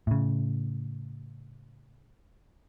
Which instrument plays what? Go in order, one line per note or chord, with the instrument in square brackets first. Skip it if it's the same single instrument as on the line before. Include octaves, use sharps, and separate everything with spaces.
[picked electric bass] A2 C#3